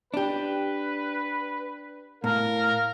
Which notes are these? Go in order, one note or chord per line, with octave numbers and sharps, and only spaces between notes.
D4 G4 B4
A2 A#4 F5